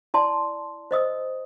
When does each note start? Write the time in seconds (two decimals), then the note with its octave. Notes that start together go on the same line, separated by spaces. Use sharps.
0.14 E4 D5 A5 C6
0.91 C5 D#5 D#6 E6